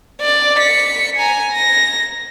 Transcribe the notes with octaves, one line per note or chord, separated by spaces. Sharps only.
D5
B6 C#7
G#5 A#5
A#6